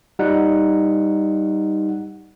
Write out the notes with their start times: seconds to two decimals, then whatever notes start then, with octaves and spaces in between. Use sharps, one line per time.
0.19 G3 D#4 F#5